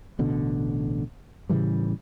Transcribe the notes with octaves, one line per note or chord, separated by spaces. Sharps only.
A1 B2 D3
A2 C#3 E3 G3